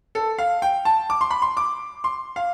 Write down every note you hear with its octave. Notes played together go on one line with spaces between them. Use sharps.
A4
F5
G5
A5
D6
C6
B5
C6
D6
C6
F5